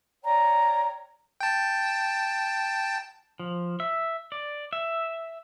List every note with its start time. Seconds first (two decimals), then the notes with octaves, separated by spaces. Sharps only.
0.23 C#5 D5 G5 A#5
1.41 G5 A5
3.39 F3
3.80 E5
4.32 D5
4.73 E5